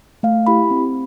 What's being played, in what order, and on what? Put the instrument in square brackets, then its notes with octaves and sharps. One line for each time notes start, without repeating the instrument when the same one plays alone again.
[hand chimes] A3 F5
E4 G4 B5
C4